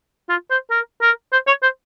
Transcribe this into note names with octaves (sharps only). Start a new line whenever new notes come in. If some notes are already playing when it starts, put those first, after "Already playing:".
F4
C5
A#4
A#4
C5
C#5
C5